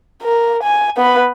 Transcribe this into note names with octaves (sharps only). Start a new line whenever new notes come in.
A#4
G#5
B3 B4